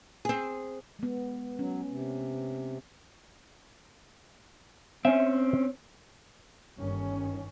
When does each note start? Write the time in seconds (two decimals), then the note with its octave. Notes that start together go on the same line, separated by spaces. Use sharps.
0.25 C4 G#4
0.99 G#3 B3
1.59 F#3 C#4
1.90 C3
5.05 C4 C#4 E5 G#5
6.77 G1 G2 D#3 C#4